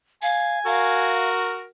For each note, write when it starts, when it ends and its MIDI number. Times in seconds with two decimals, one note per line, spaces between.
0.23 0.59 77
0.23 1.13 80
0.66 1.65 66
0.66 1.65 70
0.66 1.29 77